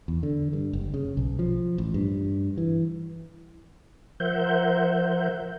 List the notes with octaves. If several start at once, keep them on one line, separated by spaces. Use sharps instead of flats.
E2
D3
G2
F#1
C#3
B1
F3
A1
G2
E3
F3 A#4 C5 E5 F#5 G6